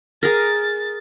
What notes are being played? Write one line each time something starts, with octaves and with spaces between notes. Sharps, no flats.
G#4 A#4 A6